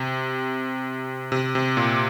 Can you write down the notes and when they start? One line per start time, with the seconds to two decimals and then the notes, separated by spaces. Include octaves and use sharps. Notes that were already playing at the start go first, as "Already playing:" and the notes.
Already playing: C3
1.32 C3
1.55 C3
1.77 A#2